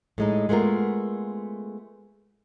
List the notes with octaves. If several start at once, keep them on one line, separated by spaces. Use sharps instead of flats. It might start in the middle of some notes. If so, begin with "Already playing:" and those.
A2 G#3 D#4
G#3 A3 B3 F4 A#4